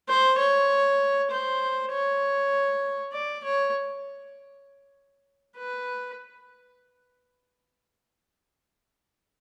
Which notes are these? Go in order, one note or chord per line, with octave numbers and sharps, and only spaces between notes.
C5
C#5
C5
C#5
D5
C#5
B4